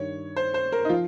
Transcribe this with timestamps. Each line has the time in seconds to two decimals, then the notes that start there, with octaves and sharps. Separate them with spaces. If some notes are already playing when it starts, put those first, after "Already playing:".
Already playing: G2 D#3 C#5
0.36 C5
0.54 C5
0.72 A#4
0.85 D#4
0.89 F3 F4